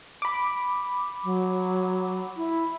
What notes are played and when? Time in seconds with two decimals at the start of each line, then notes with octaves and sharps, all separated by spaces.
0.22 B5 D6
1.24 F#3
2.37 E4